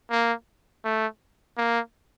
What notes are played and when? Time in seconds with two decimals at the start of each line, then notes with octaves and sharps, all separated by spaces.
0.11 A#3
0.85 A3
1.58 A#3